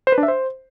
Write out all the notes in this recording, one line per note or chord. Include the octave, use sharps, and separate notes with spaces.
C5
B4
D4
E5
C5